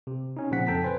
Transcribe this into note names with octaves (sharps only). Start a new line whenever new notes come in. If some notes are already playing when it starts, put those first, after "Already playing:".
C3
C#4 D#4
A#2 C#3 F3 C4 F#5 B6
F2 A4 G5 A5 A#5 B6
B4 C5 G#5